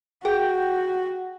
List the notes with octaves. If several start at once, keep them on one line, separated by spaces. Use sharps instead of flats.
F#4 G#4 G5